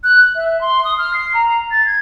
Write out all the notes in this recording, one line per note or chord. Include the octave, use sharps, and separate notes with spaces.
F#6
E5
C6
D#6
F6
C7
A#5
A6
G#6